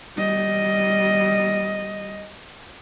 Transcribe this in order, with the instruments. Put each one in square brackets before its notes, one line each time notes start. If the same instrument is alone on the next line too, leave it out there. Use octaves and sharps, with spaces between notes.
[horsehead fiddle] G3 D#5